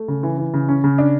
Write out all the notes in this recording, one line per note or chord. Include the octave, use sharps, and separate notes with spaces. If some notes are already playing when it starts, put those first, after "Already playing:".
Already playing: A3
C#3
E3
E3
C#3
C#4
C#3
D4